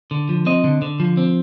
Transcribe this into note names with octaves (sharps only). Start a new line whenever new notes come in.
D3
F3
C4 D#5
D3
D3
F3
C4